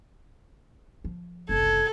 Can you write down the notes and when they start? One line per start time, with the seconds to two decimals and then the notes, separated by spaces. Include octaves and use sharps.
1.04 F3
1.49 F#1 C2 A4 G#6